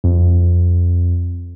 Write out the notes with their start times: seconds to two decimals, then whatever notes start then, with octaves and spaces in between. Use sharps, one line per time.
0.04 F2